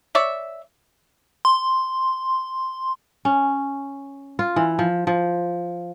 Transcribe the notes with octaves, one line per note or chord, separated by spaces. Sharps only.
C#5 D5 E5
C6
C#4
F4
E3
F3
F3